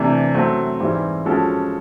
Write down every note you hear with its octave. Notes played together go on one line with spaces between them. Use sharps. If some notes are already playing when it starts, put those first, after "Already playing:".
Already playing: C3 E3 A3 D4
F#3 A3 C4
G#2 E3 G3 C4 E4
F3 G#3 C#4 F#4 A4